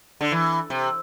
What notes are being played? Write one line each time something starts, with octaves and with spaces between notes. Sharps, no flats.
D3
E3
C3